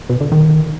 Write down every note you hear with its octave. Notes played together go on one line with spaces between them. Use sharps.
B2
D3
D#3